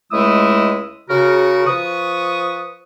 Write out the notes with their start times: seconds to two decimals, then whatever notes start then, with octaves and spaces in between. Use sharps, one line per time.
0.12 C#2 G#3 A3 E4 D#6 E6
1.09 C#3 F#4 A#4
1.66 F3 B4 C#6 D#6